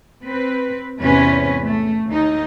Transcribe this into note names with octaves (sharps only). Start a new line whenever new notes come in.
C4 B4
E2 G#2 C3 C#4 B4
A3
D#2 D#4